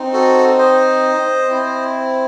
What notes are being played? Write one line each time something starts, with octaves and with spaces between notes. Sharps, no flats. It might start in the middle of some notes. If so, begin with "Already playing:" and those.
Already playing: C4 D#4
F#4 A4
C5 D#5
C4 E4